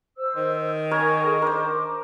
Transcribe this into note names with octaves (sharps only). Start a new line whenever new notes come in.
C5 E6
D#3
A#4 C#5 G#5 G#6
G#4 A4
D4 A#4 C5 D6